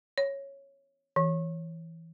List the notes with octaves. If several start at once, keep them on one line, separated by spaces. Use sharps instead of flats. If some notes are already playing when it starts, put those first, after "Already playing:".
C#5
E3